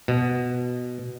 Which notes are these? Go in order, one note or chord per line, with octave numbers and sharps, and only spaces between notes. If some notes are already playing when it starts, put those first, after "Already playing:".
B2